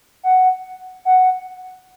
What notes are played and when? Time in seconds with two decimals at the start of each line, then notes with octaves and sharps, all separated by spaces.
0.23 F#5
1.05 F#5